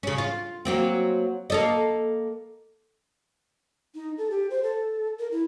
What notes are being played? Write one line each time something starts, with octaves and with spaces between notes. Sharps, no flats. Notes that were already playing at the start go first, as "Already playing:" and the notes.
C#3 C#4
F4
F#3 A#3 C4
A#3 A4 D#5
D#4
A4
G4
C5
A4
A#4
E4